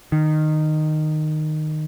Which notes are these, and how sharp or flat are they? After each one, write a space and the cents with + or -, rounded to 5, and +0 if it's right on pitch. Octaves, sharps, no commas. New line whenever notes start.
D#3 -15